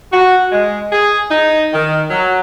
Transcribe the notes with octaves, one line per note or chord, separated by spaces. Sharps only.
F#4
G#3
G#4
D#4
D#3
F#3